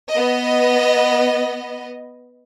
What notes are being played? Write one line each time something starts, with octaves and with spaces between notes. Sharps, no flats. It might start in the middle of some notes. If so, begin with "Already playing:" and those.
B3 D#5